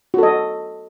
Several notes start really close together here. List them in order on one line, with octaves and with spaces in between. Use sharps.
F#4 A4 D#5